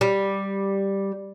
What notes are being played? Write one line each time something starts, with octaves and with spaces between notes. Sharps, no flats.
G3